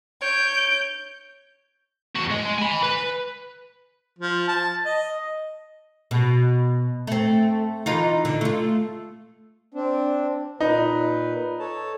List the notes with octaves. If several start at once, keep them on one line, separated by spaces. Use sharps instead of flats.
C#5 G6 D7
E2 F#4
G#3
G#5 B5
B4
F3
A5
D#5
B2
A3 C4
E3 D#4 F4
D3
A3 F4
C4 D4
A#2 D#4 B4
A4 C#5 A5